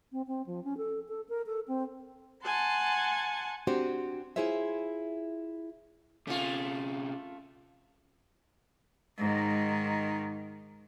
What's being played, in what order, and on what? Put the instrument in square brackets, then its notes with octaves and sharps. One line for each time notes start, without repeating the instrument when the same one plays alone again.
[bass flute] C4
C4
F3
C#4
A4
A4
A#4
A4
C4
[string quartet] F#5 G#5 A5 C6
[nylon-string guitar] C4 D4 F#4 G4 C5
E4 F4 G#4 C5 C#5 E5
[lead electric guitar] C3 C#4 [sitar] A3 F4
[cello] G#2 D#3